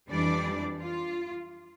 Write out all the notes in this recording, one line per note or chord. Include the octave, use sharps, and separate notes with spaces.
F2 E3 G3 D4 D5
F4